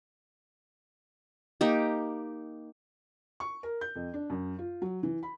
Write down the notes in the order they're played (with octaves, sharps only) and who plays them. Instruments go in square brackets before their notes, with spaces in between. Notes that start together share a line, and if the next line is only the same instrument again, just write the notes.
[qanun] A#3 D#4 G4
[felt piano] C#6
A#4
G6
F2
D4
F#2
F4
F#3
E3
B5